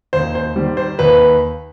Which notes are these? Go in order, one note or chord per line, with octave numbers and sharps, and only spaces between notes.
D#2 C5
C5
D#3 G3
C5
D#2 B4